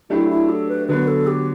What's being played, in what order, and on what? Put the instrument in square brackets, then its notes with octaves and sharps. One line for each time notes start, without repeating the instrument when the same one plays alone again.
[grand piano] F#3 A3 D4 G4 [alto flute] E4
[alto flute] E4
A4
B4
[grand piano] D3 F#3 B3 [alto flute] B4
[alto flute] A4
G4